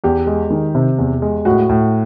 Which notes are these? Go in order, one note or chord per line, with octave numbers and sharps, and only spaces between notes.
E2 G4
G#3
D#3
C3
E2
G#3
A2 F#4
A2